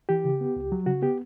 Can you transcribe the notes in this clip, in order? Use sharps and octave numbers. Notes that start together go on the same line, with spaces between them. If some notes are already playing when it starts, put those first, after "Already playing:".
E3 G4
C#3
B3
C#2
F#3
C#3 F#4
B3 G4